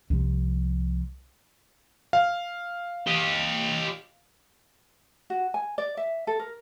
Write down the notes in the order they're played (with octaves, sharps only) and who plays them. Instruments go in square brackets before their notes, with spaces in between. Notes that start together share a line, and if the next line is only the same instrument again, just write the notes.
[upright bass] C2 F3
[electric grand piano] F5
[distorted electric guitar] G4 D#5
[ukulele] F#4
G#5
D5
E5
A4
A#4